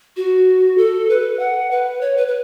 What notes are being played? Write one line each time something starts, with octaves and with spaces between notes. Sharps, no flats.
F#4
A4
B4
F#5
B4
C#5
B4
B4